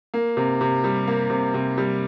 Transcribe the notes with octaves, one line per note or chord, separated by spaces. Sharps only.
A#3
C3
C3
G3
A#3
C3
C3
G3